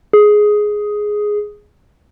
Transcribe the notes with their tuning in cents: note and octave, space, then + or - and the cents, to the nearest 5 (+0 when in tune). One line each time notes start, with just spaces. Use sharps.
G#4 +5